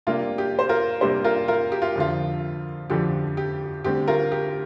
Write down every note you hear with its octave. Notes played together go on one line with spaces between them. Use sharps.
C3 G3 A#3 D4 F4
G4
C5
F4 A#4
C3 G3 A#3 D4 G4 C5
F4 A#4
F4 A#4
G4
F4
F2 D3 F3 F4
F2 D3 F3 G4
G4
D2 D3 G3 C4 G4
F4 A#4
G4